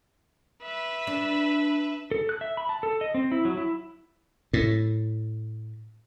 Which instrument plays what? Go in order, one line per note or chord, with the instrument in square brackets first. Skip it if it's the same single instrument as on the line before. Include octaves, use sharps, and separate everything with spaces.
[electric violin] B4 E5
[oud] D4
[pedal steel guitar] A4
F#6
E5
B5
A5
A4
D#5
C4
E4
F#3
E4
[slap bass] A2